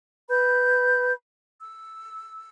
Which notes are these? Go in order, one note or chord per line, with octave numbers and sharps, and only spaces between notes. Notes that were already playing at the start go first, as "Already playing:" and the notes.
B4 B5 G6
E6